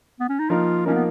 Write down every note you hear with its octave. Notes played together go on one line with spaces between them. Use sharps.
B3
C#4
D#4
F3 A#3 D#4 F4 A#4
F3 A#3 C#4 D#4 A#4
B3